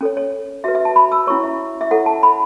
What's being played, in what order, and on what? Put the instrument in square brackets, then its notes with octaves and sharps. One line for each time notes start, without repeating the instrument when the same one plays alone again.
[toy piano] C#4 A4 C#5
C#5
F#4 B4 E5
E5
A5
B5
E6
C#4 E4 C#5 C#6
E5
E5
E4 A4 C#5 F#5
A5
B5